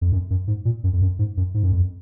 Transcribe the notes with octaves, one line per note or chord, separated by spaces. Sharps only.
F2
F#2
F#2
G#2
A#2
F#2
F2
F#2
G#2
F#2
G#2
F#2
F2